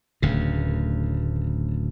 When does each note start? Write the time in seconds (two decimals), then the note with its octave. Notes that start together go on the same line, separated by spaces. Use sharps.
0.22 D1 D2 C#3